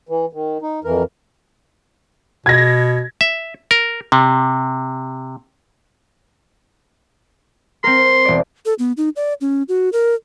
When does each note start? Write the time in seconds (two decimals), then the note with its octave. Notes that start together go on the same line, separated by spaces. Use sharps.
0.09 E3
0.33 D#3
0.62 D#4
0.84 F2 E3 A#4
2.46 B2 G#6 A#6
3.21 E5
3.71 A#4
4.12 C3
7.84 C4 A#4 C6
8.25 E1 D5
8.66 A4
8.79 B3
8.97 D#4
9.16 D5
9.41 C#4
9.69 F#4
9.93 A#4